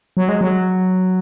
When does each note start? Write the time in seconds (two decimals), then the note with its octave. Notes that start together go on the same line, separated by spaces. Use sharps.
0.17 F#3
0.29 G#3
0.41 F#3